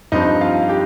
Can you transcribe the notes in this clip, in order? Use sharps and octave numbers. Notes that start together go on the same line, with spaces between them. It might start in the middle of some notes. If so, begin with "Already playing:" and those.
G2 F3 C4 D#4 D#5
F4 F5
G4 G5